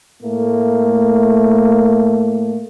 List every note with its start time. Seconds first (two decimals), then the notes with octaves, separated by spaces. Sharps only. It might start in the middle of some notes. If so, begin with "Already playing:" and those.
0.23 A2 A3 A#3